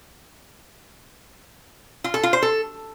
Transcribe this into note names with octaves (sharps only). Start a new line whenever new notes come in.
F4
A4
F4
C5
A4